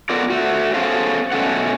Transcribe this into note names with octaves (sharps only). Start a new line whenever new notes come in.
B3 F4 A4 A#4 D5
A3 F#4
B3 C#4 G#4 A4 C5 F5
B2 A3 C#4 A4 F#5